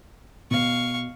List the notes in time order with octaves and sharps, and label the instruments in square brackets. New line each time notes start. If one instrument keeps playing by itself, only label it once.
[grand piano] B2 [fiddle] F5 C#6